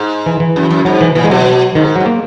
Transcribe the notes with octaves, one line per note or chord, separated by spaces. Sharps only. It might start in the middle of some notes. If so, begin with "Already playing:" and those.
Already playing: G#2
E3
E3
F#2
F#2
G#2 F#3
E3
A#2 E3
G#3
B2 F#3
G#2 D#3
F#3
G#2
A#3